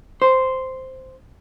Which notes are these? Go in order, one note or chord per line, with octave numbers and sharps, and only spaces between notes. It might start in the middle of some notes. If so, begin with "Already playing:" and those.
C5